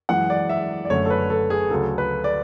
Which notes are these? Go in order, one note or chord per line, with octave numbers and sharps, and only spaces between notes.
F#2 E3 G#3 F#5
D5
E5
D5
F#1 F#2 D3 A3 C#4 C#5
A4
B4
A4
G#4
D2 C#3 F#3 A4
B4
D5